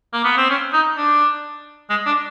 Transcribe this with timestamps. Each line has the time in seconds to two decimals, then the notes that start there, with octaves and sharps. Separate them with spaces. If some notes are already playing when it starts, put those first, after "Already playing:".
0.13 A#3
0.24 B3
0.37 C4
0.50 C#4
0.73 D#4
0.97 D4
1.90 G#3
2.06 D4